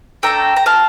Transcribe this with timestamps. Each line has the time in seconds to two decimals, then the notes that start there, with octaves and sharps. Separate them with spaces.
0.23 A3 D4 A4 G5 A#5
0.56 A#5
0.66 F5 A5